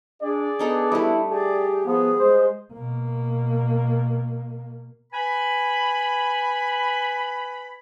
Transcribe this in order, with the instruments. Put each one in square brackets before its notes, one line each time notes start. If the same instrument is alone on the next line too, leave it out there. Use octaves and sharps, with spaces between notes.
[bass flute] D4 [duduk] G#4 [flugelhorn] D5
[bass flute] B3 [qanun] D4 D#4 A4
[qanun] G3 A3 [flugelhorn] E4
[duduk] G4 [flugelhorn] G#4 [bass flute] D5
[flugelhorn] F3 [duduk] B3 [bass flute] G#4
[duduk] G#3 [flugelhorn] C5
[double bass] B2 A#3
[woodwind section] B4 G#5 B5